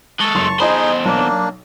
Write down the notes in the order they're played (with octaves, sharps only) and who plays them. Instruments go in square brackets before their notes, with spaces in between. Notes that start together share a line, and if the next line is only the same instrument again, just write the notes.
[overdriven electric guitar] G#3 A4 [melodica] A5 C#6
[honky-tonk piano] F#1 C6 F7
[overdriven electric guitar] E2 C5 [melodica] D#4 G#4 [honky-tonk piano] D#5 A5 B5
[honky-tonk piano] B1 [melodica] A#3 D4